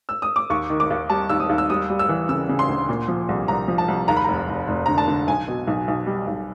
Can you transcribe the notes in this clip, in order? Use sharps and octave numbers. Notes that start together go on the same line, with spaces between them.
E6
D#6
D6
D#2 C#6
D#3
D6
D#2
G3 A5
D#2 E6
D#6
D#2
E6
G3 D#6
G3
E6
E3
C#3 E6
C#3
C6
D2
A#2
F3
C2
C2 A#5
F3
A5
C2
D#2 A#5
B5
F1 A#5
F1
F1
D3 A#5
A5
D3
B1 G#5
B2
B1
B1
G3
B1